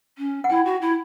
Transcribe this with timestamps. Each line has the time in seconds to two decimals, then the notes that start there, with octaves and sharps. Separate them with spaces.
0.18 C#4
0.44 F#5
0.50 E4 G5
0.65 F#4
0.81 E4